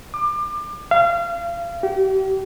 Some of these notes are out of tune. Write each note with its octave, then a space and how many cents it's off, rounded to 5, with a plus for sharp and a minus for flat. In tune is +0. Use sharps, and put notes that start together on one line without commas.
D6 +30
F5 -30
G4 -35